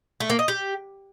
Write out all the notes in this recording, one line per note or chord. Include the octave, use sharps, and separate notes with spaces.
A3
A#3
D#5
G4